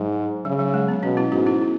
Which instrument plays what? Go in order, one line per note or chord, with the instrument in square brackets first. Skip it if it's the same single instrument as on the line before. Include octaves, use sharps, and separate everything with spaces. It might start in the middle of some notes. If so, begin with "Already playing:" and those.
Already playing: [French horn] G#2 [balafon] F#3
[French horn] C#3 [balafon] F#3
[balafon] F#3
G#3
B3
[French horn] B2 [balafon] C#4
[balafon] B3 E4
[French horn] G#2 [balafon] C#4 F#4
[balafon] B3 E4
B3 E4